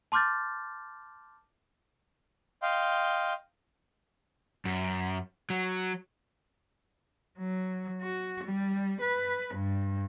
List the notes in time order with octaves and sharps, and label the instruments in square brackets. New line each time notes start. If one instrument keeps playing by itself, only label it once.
[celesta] A5 C6 D6 F6 G6 A6
[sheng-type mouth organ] D#5 F5 G5 C6
[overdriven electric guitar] F#2
F#3
[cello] F#3
F#4
G3
B4
G2